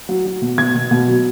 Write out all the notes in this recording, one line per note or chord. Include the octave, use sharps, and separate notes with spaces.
F#3
F#3
B2
B2 G#6
B2
B2
F#3